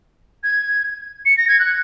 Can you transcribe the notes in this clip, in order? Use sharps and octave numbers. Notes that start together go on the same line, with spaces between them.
G#6
C#7
A#6
G#6
F#6